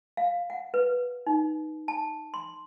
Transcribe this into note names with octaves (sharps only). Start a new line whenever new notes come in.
F5
F#5
B4
D#4
A5
C6